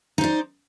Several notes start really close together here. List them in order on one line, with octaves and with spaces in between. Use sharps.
D#4 C5 D5